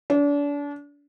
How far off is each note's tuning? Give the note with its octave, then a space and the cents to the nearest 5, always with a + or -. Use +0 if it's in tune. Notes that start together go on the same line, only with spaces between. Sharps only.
D4 -35